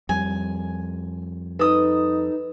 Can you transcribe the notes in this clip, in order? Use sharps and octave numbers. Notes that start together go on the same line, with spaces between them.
F2 G3 G#5
D#4 A4 B4 D#6